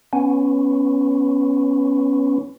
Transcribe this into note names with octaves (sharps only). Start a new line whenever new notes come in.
B3 C#4